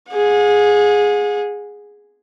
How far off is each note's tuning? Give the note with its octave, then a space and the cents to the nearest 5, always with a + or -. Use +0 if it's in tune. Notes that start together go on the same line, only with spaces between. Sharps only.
G#4 +0 F#5 -45